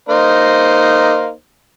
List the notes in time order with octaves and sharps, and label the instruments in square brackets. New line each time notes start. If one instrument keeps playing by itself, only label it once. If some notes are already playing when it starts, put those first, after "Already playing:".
[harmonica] A#3 D#4 C5